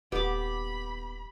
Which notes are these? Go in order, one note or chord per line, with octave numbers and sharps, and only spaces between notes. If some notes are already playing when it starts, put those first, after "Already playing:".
D#1 B3 G4 B5 D6